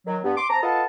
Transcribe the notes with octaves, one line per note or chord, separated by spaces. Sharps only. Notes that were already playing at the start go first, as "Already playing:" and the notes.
D#3 F#3
G2 B3
C6 D6
C4 A5 A#5
F4 A4 B4 D#5 F#5 A5